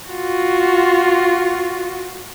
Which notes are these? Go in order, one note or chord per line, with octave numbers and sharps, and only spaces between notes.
F4 F#4